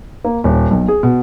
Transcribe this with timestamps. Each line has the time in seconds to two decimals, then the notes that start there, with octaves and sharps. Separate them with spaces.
0.25 A#3
0.44 D#1
0.71 B1
0.88 G#4
1.03 B2